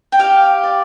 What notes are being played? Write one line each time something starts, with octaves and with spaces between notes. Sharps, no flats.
G5
G4 F5
D5